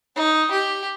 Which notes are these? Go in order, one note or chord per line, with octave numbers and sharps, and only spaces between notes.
D#4
G4